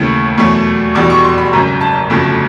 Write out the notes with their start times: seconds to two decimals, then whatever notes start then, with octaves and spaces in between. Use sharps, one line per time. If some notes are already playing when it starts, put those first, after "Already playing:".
Already playing: D#2 C#3 E3 A3
0.38 E2 B2 F#3 A3
0.95 F1 E2 B2 G3 D6
1.10 C#6
1.24 C6
1.38 B5
1.53 G#1 F#2 C#3 A#5
1.81 A5
2.10 G1 F2 C#3 F#3 A3